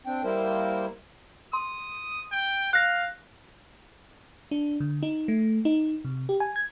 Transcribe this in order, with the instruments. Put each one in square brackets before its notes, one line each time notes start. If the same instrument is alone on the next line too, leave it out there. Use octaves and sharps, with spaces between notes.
[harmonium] C4 D4 G5
G3 A#3 E4 A#4 C5
[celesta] C6 [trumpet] D#6
[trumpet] G5
[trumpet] F5 [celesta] F#6 A#6
[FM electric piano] D4
D3
D#4
A3
D#4
C3
G4
G#5
G#6